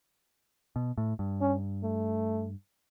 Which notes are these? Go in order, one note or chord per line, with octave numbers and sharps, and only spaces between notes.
B2
A2
G2
C#4
A3